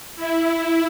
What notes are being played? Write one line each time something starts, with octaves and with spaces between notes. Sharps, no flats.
E4
E4